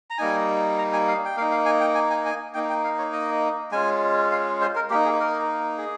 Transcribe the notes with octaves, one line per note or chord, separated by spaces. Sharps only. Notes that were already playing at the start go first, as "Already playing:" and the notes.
A#5
G3 A#3 D#4 G#5
A#5
G#5
F5
G5
A#3 D#4 F5
F5
G#5
G5
G#5
G#5
G#5
A#3 D#4 G5
G5
F5
C#5
D#5
G#3 C#4 F4 G#5
F5
C5
A#4
A#3 D#4 G4
G#4
A#4
G#4